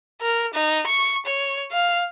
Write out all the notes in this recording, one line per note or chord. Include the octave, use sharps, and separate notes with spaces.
A#4
D#4
C#6
C#5
F5